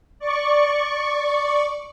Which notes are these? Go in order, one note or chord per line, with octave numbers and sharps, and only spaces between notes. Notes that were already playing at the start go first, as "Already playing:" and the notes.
D5 C#6